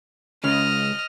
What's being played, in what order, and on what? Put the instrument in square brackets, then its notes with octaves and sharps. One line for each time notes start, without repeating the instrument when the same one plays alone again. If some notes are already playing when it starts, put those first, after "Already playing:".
[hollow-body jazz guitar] C#2 C#3 [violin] D#5 F6